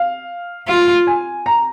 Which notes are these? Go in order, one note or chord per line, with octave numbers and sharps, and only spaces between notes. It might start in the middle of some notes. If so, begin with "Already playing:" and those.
Already playing: F5
F4
G#5
A#5